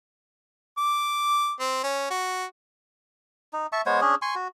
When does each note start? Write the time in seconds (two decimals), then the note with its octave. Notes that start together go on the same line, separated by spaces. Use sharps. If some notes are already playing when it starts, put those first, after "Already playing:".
0.78 D6
1.60 C4
1.84 C#4
2.11 F#4
3.53 D#4
3.72 E5 A5 C#6
3.86 G#3 B3 C5 C#5
4.01 C#4 D4 G#4
4.22 G#5 C6 C#6
4.35 F#4